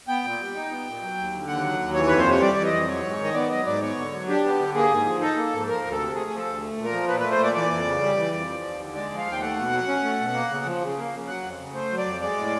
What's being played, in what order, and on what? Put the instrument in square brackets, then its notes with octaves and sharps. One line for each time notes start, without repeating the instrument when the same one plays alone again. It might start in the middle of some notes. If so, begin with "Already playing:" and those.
[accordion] B3 G5
A#2
G3
D#4
B3
A#2
F#3
D#2
D3
D#2 F#5
F#3
D#2
E3 C#5
F2 B4
C5
C3 C#5
G3 D5
E3
D#5
F2
F#3 C#5
G#2
D#3
D#5
B3 D5
F#3 D#5
G#2 D5
B3 C#5
D3
F#3
D4 G4
B3
D3
A#3 G#4
G#2
F3
D#4 A4
A#3
G#2
F3 A#4
D2
A4
C3
A3 G#4
F3
A4
D2
A3
A#2
A#4
F3
A#2 B4
A3 B4
C5
A#2 D5
E3 D5
F2
C#3
G3
E3
F2
F3
D#2
D3
G#3 D5
F3
F5
D#2
G5
A3 F#5
B2
F#3
C#4
A3
B2
A#3
C#3
F3
C#3
A#3
C#3
F#3 F#5
F2
C#3
A3 C5
F#3
D5
F2
G#3 D5
A2